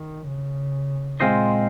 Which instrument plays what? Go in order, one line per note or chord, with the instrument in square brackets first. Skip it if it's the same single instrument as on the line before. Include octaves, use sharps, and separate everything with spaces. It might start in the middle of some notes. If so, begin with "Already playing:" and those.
Already playing: [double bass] D#3
C#3
[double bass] A#2 [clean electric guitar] G#3 C4 F4 C5 D#5